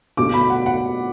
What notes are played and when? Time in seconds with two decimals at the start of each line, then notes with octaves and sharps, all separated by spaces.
0.17 B2 F#3 A3 D6
0.33 B5
0.50 F#5
0.66 F#5